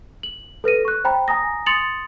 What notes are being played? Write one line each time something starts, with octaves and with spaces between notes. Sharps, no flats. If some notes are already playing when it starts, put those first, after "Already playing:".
F#7
A4 B4 A#6 D#7
C#6 F#6
C5 G5 A#5 B5
G#5 A#5 D#6 A#6
C6 D#6 A6 C#7 F7 F#7